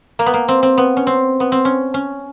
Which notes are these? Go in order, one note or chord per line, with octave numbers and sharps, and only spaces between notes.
A#3
B3
A#3
C4
C4
B3
C#4
C4
B3
C4
C#4
C#4